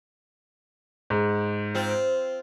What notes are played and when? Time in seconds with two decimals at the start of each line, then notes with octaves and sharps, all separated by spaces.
1.10 G#2
1.75 C4 F4